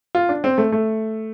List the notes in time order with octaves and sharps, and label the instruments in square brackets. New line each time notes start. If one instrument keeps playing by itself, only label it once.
[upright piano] F4
D4
C4
A3
A3